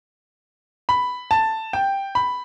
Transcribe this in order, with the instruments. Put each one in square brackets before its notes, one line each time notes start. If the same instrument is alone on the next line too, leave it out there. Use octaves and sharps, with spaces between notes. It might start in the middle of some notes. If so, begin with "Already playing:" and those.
[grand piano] B5
A5
G5
B5